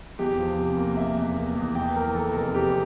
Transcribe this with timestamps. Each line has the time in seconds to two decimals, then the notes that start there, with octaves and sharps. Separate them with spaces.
0.19 E2 G4
0.39 F3
0.58 C3
0.77 A#3
0.97 A#3 E5
1.17 E2
1.36 A#3
1.56 E2
1.75 E3 G5
1.95 E3 A#4
2.08 A#4
2.14 E3 A4
2.34 F1 A#4
2.54 F1 G4